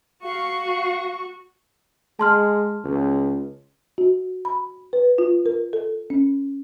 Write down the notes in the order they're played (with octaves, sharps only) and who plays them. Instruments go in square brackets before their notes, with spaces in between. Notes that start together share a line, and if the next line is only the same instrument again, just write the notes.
[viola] F#4 C#6 [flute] F5
[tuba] G#3 [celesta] A5 C6 F6
[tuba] C#2
[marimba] F#4
B5
B4
F4
A#4
A4
C#4